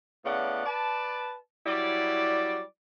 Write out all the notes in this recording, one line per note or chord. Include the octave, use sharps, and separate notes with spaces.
A2 C#3 B3 D5 F#5
B4 D5 A5
F#3 G3 E4 D5